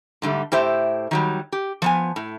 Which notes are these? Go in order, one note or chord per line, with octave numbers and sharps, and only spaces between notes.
G#2 D3 G3 A3
A2 G4 C5 E5
D#3 F#3 G3
G4
F3 B3 G#5
A2